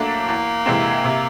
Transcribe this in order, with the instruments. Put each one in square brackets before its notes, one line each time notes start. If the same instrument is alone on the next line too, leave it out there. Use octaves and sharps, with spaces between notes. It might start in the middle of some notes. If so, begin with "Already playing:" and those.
Already playing: [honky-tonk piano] F#3 A3 D4 [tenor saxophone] A#3
[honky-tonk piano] E2
C3 E3 G#3 C4
C3